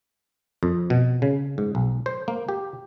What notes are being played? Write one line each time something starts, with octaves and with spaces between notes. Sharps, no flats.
F2
B2
C#3
G#2
B1
C5
A#3
G4